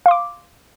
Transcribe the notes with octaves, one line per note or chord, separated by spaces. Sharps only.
F5 C6 D6